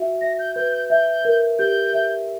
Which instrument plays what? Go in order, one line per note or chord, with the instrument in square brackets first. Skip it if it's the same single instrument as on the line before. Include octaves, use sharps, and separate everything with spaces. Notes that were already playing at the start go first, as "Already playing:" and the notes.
Already playing: [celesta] F#4 E5
[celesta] E5 [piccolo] A#6
[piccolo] G6
[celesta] B4 [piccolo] G6
[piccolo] G6
[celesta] E5 [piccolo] G6
[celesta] A#4
[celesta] G4 [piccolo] G6
[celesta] E5